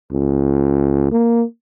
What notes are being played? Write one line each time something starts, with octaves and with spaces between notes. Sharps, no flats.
C#2
A#3